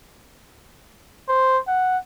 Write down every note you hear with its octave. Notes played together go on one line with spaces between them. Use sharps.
C5
F#5